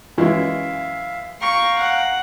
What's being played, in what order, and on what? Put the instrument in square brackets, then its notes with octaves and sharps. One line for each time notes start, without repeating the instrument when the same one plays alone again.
[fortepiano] F#2 E3 G#3 [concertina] E5 F5
[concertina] F5 G5 A#5 [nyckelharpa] C#6
[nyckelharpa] F#5